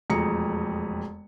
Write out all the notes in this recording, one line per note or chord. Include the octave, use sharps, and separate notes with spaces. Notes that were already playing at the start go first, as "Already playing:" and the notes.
E1 F2 A3 G#4 A#5 C#7